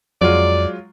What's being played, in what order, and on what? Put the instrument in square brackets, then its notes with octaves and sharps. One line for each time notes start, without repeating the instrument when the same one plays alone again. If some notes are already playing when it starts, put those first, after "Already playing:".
[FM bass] F2 [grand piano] F#3 G#3 F4 [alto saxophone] D5